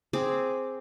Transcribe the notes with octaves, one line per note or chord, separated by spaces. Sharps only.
C4 G#4 D6